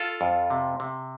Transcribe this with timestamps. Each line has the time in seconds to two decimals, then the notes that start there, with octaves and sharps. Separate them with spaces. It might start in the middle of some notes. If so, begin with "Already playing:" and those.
Already playing: F4 A4
0.21 F2
0.50 C3
0.80 C3